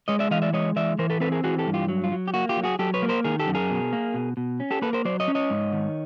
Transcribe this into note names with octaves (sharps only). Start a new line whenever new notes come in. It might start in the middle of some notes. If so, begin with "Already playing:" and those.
G#3 C#5 D#5
D5 E5
E3 D#5 F5
D5 E5
G#3 C#5 D#5
E3 D5 E5
E3 A#4 C5
A4 B4
C4 A4 B4
G#4 A#4
E3 F#4 G#4
G4 A4
G2
F4 G4
F#3
F4
F#3
G4
A#3 F#4
F4 G4
F#3
F#4 G#4
F#3 G4 A4
B4 C#5
A#3
A#4 C5
D#3 G#4 A#4
G4 A4
F#2
G#4 A#4
B2
A#3
B2
B2
C#4
G4 A4
A#3 A4 B4
A#4 C5
F#3 C5 D5
C#5 D#5
C#4
C#5 D#5
G#2
D#3